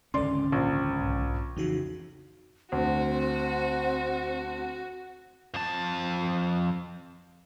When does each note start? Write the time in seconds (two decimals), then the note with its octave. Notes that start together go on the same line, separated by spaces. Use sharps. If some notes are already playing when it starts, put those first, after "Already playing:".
0.14 G#1 C#2 D3 C#4 A4 D5 C6
0.52 A#1
1.01 B1 G#2
1.57 F2 C#3 E3 D#4 F#4
2.72 D2 C4 F#4
5.54 F2 A5